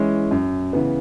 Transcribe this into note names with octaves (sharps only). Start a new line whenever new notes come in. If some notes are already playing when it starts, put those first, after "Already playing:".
Already playing: E3 G#3 C#4 E4
F#2
C#3 E3 B3